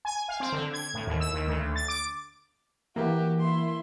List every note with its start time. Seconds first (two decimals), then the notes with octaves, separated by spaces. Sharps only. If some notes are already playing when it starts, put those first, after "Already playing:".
0.05 G#5
0.28 F5
0.40 C4
0.52 D3
0.73 G#6
0.94 A2
1.07 D#2
1.20 E6
1.34 D#2
1.47 D2
1.76 A6
1.88 D6
2.96 E3 A#3 F#4 G4
3.41 E4 C6